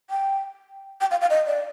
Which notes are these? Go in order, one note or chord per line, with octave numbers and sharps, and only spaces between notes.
G5
G5
F5
F5
D#5
D5